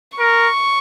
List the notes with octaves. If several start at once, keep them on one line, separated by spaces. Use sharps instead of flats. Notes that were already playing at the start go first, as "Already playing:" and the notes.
A#4 C#6